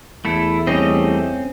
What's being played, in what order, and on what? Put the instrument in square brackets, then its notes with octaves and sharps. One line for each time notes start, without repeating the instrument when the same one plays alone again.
[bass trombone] E2 [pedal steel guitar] A3 E4 A4
[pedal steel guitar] G3 A3 D#5 [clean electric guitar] C4 C#4